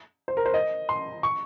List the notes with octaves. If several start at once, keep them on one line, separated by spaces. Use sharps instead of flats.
C5
A#4
C5
D#5
C6
C#6